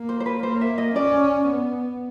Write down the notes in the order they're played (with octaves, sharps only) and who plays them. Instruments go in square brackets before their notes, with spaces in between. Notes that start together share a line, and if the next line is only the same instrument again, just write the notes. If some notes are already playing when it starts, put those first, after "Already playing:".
Already playing: [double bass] A#3
[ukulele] C5
C5
B4
[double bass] A#3 [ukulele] C5
[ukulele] E5
D#5
[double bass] C#4 [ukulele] D5
[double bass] B3